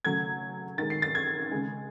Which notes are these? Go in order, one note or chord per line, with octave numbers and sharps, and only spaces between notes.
C#3 F#3 A3 G#6
D#3 G#3 A6
C7
A6
G#6
C#3 G#3